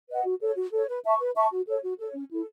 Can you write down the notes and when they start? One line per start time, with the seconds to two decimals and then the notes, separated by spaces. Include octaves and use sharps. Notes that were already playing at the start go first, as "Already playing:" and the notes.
0.09 B4 D#5 F#5
0.25 F#4
0.41 A4 C#5
0.56 F#4
0.72 A4 C#5
0.88 B4
1.04 E5 A5 C#6
1.19 B4
1.35 E5 A5 C#6
1.51 F#4
1.66 A4 C#5
1.82 F#4
1.98 A4
2.03 C#5
2.14 C#4
2.30 E4 A4